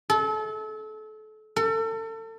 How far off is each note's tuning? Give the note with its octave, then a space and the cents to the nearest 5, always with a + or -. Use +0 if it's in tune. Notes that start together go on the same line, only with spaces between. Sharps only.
A4 -30
A4 +35